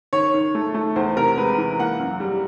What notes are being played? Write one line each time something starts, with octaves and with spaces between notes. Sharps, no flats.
D#3 C#5
D#3
A3
A3
E2 C5
C3 A#4
G#3 B4
E3
A#3 F#5
F#2
G3